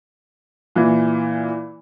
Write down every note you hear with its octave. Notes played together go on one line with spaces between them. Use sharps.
A#2 E3